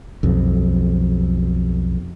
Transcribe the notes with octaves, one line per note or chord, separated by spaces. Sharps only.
B1 F2